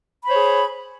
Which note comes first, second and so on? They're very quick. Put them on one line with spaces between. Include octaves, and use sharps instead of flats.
B5 C5 C#5 G#4